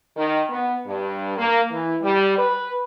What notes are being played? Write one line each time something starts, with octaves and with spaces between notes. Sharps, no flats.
D#3
B3
G2
A#3
E3
G3
B4